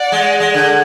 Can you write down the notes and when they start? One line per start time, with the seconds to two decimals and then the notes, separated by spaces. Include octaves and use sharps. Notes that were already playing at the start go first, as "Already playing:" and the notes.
Already playing: D5 F#5
0.12 G#3
0.40 G#3
0.54 D3